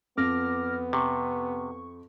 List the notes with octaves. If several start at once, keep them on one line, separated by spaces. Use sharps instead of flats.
F2 B3 D6 F6 A#6
C3 C#6